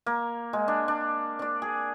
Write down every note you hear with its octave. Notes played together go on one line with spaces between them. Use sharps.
A#3
G#3
D4
D4
D4 D5
G#4